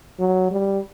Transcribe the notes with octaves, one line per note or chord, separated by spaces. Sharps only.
F#3
G3